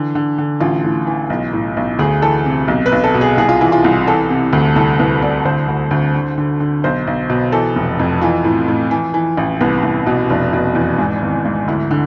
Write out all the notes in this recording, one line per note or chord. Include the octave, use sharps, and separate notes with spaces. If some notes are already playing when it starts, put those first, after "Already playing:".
Already playing: D3 E3
D3
D3
A1 F4
A2
E3
B1
A2
B1
D2 G#4
E3 A4
C3
B1
B4
B1
A4
B2
G#4
C2 G#4
F4
E3 E4
F4
C2
E3 A4
C3
D2
C2 A4
C2 B4
C2 D5
D2 C5
D2
D2
D3
D3
D3
B1 C5
B1
B2
E3 A4
F1
F2
E3 F4
A2
A2
E3
E3
A1
C2 B3
C2
B2
F1 D4
B2
E2
G#2
G#1
G#2
D2 E4
D3